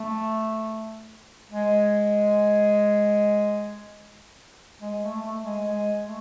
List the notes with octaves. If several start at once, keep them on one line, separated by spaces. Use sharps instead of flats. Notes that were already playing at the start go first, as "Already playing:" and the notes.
Already playing: A3
G#3
G#3
A3
A3
G#3
G#3
A3